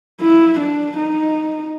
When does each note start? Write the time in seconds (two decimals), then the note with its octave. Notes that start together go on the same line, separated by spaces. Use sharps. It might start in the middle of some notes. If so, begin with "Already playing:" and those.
0.21 E4
0.59 D4
0.97 D#4